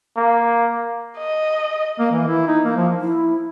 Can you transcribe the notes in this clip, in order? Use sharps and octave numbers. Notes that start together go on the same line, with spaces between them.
A#3
D#5
A#3
E3
E4
D#4
A#3
F3
E4